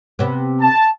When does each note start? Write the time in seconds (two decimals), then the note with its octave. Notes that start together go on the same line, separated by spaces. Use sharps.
0.19 C3 B3
0.61 A5